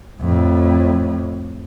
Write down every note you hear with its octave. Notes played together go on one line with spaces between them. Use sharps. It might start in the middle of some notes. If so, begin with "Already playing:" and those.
F2 A2